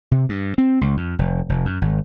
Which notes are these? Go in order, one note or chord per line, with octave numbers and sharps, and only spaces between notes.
C3
G2
C4
C#2
F2
F1
F1
F#2
G#1